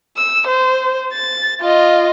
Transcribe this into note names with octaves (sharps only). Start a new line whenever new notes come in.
E6
C5
A6
F4 D#5